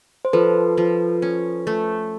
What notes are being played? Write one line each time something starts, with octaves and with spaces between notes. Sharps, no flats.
C5
F3 A4 B4
F3
C#4
A3